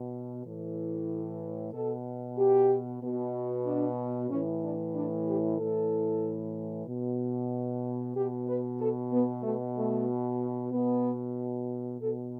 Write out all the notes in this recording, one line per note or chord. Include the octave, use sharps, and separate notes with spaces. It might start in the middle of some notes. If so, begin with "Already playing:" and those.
Already playing: B2
A2 E3
B2 A4
G4
B2
D4
A2 E3 C#4
D4
D4
G4
A2 E3 A4
B2
B2 G4
B4
A4
B3
B2 A3
A3
B2 B3
B2 A4